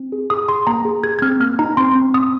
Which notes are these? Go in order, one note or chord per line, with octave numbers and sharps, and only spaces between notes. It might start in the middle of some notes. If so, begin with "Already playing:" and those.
Already playing: C4
G#4
G#4 D#6
G#4 C6
A#3 A#5
G#4
G#4 G#6
G#6
C4 F6
A#3 F6
D#4 A#5
C4 C6
C4
C4 D#6